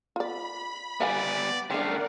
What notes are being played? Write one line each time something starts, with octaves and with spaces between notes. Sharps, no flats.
F4 D5 B5
G3 B3 D5 E5 F5 G#5
C#3 A3 C4 D4 A#4 D5 F5 F#5